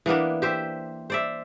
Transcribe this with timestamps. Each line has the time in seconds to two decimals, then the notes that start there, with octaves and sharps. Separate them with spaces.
0.06 E3 A#3 B3 D4
0.42 G4 C5 E5
1.10 C5 D5 E5